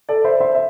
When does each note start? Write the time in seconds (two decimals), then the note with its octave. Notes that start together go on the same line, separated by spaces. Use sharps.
0.09 A4 D5
0.24 C5 E5
0.40 C5 E5
0.55 E5